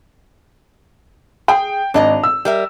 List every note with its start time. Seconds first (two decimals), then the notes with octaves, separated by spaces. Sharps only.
1.48 G#4 G5
1.94 G#1 D4 D#5 A#5
2.23 E6
2.45 G3 A#4 E5